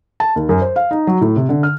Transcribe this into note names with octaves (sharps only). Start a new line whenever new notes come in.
A5
D#2
F#2
C5
F5
D#4
F#3
A2
C3
D3
F6